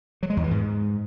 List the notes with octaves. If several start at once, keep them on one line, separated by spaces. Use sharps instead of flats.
F#3
G#3
E2
E3
G#2